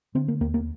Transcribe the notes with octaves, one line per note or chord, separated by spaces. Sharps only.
D3 C4
A#3
D#2 A#3
A#3